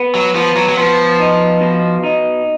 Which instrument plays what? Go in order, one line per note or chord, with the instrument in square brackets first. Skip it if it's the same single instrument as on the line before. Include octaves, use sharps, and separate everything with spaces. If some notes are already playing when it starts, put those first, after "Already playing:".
Already playing: [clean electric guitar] B3
[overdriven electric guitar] F#3
[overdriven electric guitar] F3 [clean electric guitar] B3
[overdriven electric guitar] F#3
F#3
[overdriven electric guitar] F3 [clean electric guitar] B3
[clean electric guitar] D#4
B2
D#4